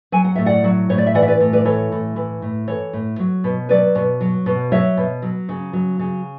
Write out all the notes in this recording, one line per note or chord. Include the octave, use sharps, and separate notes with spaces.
F#3 G#5
F#5
A2 E5
D5 F#5
F#3
A2 C#5
D5
E5
E3 D5 F#5
E5
B4 D5
A2
B4 D5
E3 A4 C#5
A2
E3
A2
E3 A4 C#5
A2
F#3
B2
F#3 B4 D5
B2
F#3
B2
F#3 C#5 E5
B2
F#3
C#3
F#3
C#3